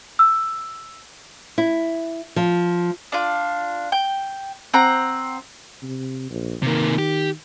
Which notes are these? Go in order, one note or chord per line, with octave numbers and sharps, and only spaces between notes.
E6
E4
F3
D4 F4
G5
C4 F#5 A#5
C3
A#1
C3 D#3 A#3
G4